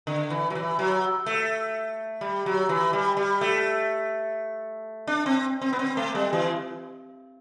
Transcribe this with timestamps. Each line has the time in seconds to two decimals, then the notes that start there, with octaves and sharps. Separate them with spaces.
0.07 D3
0.30 E3
0.50 F#3
0.55 E3
0.79 F#3
1.26 A3
2.21 G3
2.46 F#3
2.69 E3
2.93 G3
3.17 G3
3.41 A3
5.07 D4
5.26 C4
5.61 C4
5.73 B3
5.79 C4
5.97 A3
6.15 G3
6.33 E3